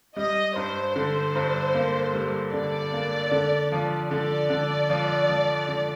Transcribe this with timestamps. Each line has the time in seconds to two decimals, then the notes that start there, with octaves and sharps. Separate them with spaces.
0.17 G3 D#5
0.56 G2 C5
0.96 D3 C5
1.36 G2
1.74 A#3
2.13 G3
2.53 D3 D5
2.93 A#3
3.32 D3
3.72 F3
4.11 D3 D5
4.50 D3
4.90 F3
5.29 F3
5.68 D3